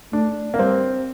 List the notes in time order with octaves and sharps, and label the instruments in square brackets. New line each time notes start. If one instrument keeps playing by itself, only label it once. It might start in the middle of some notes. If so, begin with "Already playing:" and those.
[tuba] A3 [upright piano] D4
[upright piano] A#3
[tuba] G3 [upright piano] C4